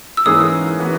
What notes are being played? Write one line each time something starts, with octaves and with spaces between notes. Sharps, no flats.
E6
G#2 E3 A#3 C#4 G#4 D#6
E3 B3 F#4